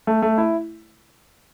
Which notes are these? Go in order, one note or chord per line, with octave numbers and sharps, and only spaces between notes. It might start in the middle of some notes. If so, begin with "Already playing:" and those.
A3
A3
E4